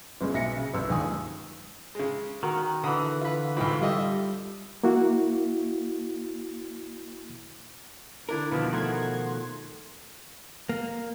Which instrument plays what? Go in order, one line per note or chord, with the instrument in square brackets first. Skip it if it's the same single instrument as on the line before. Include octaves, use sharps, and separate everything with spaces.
[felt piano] G1 G2 G#3 A#3
B1 E5 A#6 C#7
C#3
G1 C2 E6
D#1 C#2 A#2 D#3 G#5 D#6
[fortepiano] C#3 G#3
[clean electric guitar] D#3 [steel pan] F#4 A#4 F#5
[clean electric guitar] D3 E3 [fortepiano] B5 D#6
[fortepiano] F4 B4
[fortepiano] C2 G#2 [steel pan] F4 G5 [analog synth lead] B5
[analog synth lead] G3 [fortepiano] F4 D#5 E5 [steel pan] G4 A4
[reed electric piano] A#3 E4 F#4
[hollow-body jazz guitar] D3 E4 A#4 [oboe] D4
[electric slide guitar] B2 D#3 F3 [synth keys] B4 [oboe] F5
[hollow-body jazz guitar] A3 [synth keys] A#4 F#5 G#6 [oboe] C6
[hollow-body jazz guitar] A#3